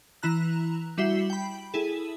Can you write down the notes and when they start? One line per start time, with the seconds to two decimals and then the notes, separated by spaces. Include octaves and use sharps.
0.23 E3 E4 A#5 F#6
0.98 G3 E4 F#4 E5 C7 G7
1.30 G5 B5
1.74 E4 G#4 A4